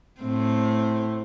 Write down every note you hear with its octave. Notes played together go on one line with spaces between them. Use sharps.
A2 C4